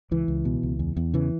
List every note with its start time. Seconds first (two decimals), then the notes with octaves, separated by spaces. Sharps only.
0.11 C#2 E3
0.28 C#2
0.45 B2
0.63 C#2
0.79 E2
0.97 E2
1.14 C#3 E3